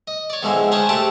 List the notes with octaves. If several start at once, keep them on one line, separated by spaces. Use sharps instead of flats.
D#5
C#5 D5
E2 G#2 D3 F3 G#3 C4
C#4 D4 G#4 C5 C#5
A3 C4 D4 G4 A5